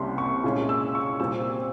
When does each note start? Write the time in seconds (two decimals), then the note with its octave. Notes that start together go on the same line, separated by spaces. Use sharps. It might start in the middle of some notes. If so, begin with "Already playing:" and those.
Already playing: C2 C3 G3 A#3 C#4 C6
0.18 C#6
0.44 A#2 G#3 C#4
0.69 E6
0.95 C#6
1.20 A#2 G3 C4 E6